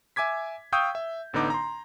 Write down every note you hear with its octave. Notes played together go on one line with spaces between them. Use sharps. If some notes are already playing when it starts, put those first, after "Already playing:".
E5 G#5 D6 G#6 B6
F5 G5 C#6 D#6 E6 G6
E5
A1 D3 B3 D#4 D6
A#5 C6